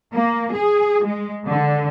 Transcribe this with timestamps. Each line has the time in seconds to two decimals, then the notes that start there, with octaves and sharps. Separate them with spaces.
0.15 A#3
0.55 G#4
1.05 G#3
1.47 D3